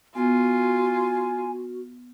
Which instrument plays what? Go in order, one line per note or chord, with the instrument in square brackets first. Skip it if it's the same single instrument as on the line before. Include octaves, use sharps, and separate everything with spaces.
[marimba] B3 [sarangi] F4 [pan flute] F#4 [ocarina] G#5